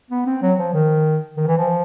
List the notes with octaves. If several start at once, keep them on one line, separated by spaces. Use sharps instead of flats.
B3
C4
F#3
F3
D#3
D#3
E3
F3